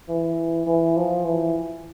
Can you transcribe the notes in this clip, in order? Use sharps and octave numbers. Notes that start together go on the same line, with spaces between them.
E3
E3
F3
E3